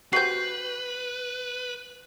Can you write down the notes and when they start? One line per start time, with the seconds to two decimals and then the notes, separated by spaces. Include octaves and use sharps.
0.13 F#4 G4 B4 C5 G6 C7